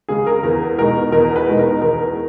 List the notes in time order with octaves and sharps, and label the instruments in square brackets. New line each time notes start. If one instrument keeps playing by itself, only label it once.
[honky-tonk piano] C#3 G#3 [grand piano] G#4
[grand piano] A#4
[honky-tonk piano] E2 [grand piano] A#4
[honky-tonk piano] B2 G#3 D#4 [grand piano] A#4
[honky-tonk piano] E2 [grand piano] A#4
[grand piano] B4
[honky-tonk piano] B2 G#3 D#4
[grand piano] A#4
[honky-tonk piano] E2 [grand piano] A#4